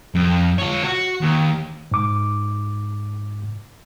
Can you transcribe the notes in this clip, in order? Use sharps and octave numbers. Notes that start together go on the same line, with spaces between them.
F2
F4 C#5
F#4
D#2
G#2 D6